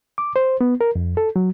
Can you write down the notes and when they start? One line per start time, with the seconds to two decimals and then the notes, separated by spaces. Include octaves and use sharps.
0.18 D6
0.36 C5
0.61 B3
0.81 A#4
0.95 F2
1.17 A4
1.36 F#3